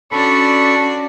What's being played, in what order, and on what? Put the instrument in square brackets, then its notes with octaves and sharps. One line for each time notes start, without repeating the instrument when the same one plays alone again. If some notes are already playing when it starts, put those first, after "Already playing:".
[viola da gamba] C#4 F#4 [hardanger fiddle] D4 D5 [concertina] A4 B5 [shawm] C#6